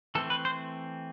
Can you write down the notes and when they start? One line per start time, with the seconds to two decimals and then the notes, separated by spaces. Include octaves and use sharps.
0.15 E3 A3 C4 A4
0.30 B4
0.45 C5